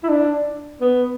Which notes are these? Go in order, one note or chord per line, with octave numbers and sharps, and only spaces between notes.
E4
D4
B3